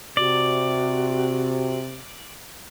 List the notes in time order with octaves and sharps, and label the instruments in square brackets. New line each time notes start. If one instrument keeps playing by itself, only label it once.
[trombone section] C3 [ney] F#4 [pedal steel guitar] D5